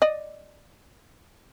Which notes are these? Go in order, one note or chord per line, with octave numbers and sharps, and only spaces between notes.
D5 D#5